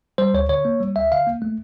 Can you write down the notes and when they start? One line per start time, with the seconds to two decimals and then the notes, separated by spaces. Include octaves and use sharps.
0.18 G3 C5
0.34 D2 C#5
0.49 D3 C#5
0.65 A#3
0.80 G3
0.96 D2 E5
1.12 D3 F5
1.27 A#3
1.42 A3